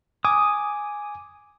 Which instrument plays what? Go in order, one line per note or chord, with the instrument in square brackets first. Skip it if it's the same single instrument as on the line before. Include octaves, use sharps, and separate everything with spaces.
[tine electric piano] G#5 D6 [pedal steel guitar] D#6